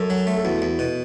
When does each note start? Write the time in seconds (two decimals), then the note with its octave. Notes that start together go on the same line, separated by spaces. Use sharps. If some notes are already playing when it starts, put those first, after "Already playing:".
Already playing: F#2 A4
0.10 F#3
0.27 A3
0.37 A4
0.44 E2 F#4
0.62 E2
0.79 B2